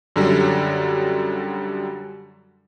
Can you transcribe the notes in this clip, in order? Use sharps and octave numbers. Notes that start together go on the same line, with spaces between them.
F#2 D3 F#3 G3